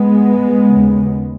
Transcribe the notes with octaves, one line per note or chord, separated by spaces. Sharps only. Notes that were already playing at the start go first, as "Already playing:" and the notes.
Already playing: G#3 B3
D#2 C#3